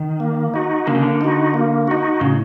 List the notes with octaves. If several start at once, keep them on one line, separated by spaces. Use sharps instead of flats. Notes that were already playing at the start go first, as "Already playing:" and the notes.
Already playing: D#3
A#3
D#4 F#4
D3 A#3
C#3
D3
D#4 F#4
A#3
D#4 F#4
A2 C#3